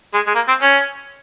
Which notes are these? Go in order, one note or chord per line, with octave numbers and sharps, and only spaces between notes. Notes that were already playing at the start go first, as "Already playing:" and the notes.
G#3
G#3
A#3
C4
C#4